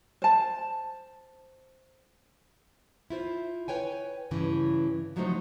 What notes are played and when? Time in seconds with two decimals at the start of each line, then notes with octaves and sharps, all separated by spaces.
0.22 C5 A5
3.10 E4 F4 C5
3.68 B4 C#5 G5 G#5
4.31 G2 C#3 E3
5.16 F3 F#3 G#3 A3 D#4 C5